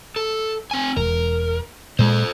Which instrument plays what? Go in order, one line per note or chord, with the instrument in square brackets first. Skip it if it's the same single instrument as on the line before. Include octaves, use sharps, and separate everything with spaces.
[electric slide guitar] A4
C4 G#5
[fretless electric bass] E1 [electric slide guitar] A#4
[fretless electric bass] A#2 G#3 [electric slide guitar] A4 C5